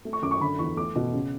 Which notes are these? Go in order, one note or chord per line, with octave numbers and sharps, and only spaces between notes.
A3
C#6
F#2 D6
C#6
D3 B5
E2 C#6
A3 D6
B2
C#3